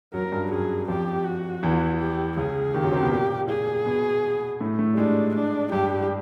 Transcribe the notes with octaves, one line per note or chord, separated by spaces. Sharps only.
F#2 F#3 A#4
F#3
G2 G3
F#2 F#3 G#4
F2 F3 G4
F#4
E2 E3
G4
C#2 C#3 G#4
D#2 D#3 G4
F#2 F#3
C3 C4
B2 B3
A#2 A#3
G#4
B2 B3
A2 A3
A2 A3
G3
G#2 G#3 D4
D4
G2 G3 G4